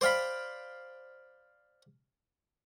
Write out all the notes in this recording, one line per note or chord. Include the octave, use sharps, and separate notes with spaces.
C5 D5 F5 G5 B5